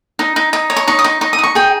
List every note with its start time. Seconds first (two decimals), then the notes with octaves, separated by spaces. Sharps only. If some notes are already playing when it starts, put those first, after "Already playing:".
0.19 D#4
0.36 D#4
0.53 D#4
0.70 C#5
0.76 C#6
0.88 D#4 C#6
0.99 D#6
1.04 D#4 C#6
1.21 D#4 C#6
1.33 D#6
1.39 D#4 C#6
1.55 G#4 G5